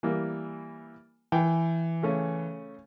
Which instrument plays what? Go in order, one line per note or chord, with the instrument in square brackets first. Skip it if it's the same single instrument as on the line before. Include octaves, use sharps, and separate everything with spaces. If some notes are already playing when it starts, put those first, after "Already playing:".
[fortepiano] E3 G3 A#3
[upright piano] E3 [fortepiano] G5
[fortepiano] C#3 A3 C#4